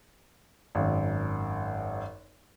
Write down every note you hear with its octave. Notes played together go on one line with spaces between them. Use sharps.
G#1 F#2